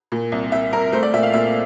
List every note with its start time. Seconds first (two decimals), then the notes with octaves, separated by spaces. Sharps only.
0.12 A#2
0.32 C2
0.52 C2 E5
0.73 C2 A#4
0.92 A3 C5
1.03 D5
1.13 A#2 E5
1.23 F5
1.33 A#2 E5